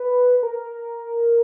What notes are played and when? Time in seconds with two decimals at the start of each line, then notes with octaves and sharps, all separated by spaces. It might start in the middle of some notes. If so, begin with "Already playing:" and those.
Already playing: B4
0.43 A#4